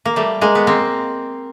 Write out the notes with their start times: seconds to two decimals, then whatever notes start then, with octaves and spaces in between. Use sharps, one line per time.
0.05 A#3
0.16 G3 A3
0.41 G#3 A#3
0.55 B3
0.67 A#3 C4